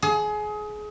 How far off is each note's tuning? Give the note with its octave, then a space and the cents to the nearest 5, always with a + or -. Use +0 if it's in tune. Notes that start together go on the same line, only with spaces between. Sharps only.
G#4 +25